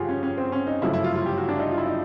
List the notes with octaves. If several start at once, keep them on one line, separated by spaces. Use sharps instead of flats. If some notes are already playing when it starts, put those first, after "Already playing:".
Already playing: G1 F2 C#3 F4 G4 G#4 F#5
C#4
C#4
C4
C#4
D#4
G1 F#2 C#3 F3 A3 E4
E4
F4
F4
G4
F#4
D4
D#4
F4
E4
D#4